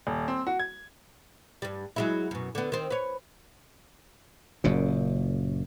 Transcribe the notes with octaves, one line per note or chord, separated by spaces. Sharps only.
D#1
C4
F#4
G#6
G2 G3
F#3 G#3 E4
F#2 B2
D3 B3
D#3 C4
B4 C#5
F#1 F#2 A#2